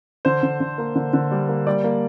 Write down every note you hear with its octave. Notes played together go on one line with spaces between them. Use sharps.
D3 C5
D3
D3
A#3
D3
D3
G3
A#3
G3 D5
A#3